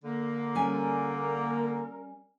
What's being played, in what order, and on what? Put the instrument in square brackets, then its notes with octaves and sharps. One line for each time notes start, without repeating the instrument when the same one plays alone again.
[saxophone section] D3 A#3
[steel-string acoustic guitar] G3 C#4 G#5 [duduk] A#4